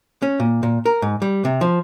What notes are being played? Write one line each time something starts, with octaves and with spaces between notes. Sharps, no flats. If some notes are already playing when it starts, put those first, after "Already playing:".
C#4
A#2
A#2
A#4
G#2
G3
C3
F3